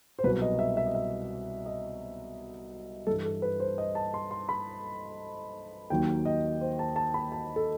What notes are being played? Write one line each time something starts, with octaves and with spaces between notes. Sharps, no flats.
C5
C2 B2 F#3 B4
D#5
E5
E5
D#5
E5
D#5
G2 E3 A4
A4
B4
C5
D#5
A5
C6
C6
B5
D#2 D#3 F#3 G5
D#5
C5
A5
A5
B5
A5
A4